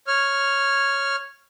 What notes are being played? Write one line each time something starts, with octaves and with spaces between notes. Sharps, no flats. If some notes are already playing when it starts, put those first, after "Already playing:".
C#5 F6